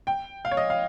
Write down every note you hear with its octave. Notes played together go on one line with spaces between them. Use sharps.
G5
F5
C#5
D#5
F5